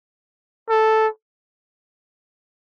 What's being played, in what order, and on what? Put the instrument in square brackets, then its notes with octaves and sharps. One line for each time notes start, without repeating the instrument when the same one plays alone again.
[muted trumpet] A4